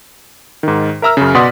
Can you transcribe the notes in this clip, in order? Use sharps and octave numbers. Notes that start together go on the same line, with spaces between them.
G#2 D#3
A#4 E5 A#5 E6 F6
F#2 C#3
B2 D5 F#5 C6 D#6 B6